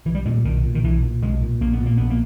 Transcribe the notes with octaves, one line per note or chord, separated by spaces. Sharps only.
B1 E3
G3
A#2 G#3
G3
B1 D#3
A#2
D#3
B1 E3
A#2
B1 G#3
A#2
A#1 A#3
B3
A#2
A#3
A#1 B3
A#3